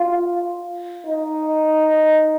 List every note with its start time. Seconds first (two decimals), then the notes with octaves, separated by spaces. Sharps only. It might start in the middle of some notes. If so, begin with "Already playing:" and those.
Already playing: F4
1.07 D#4